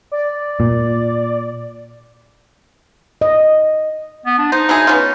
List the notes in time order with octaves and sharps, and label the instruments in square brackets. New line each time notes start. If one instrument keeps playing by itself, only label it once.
[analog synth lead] D5
[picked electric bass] A#2
[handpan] D#5
[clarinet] B3
D4
[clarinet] D#4 [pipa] C5
[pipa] F#3 E4 G#4
B3 C#4 F4